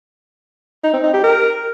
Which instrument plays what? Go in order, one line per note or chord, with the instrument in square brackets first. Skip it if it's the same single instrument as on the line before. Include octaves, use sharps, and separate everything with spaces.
[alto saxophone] D#4
C4
D#4
G4
A#4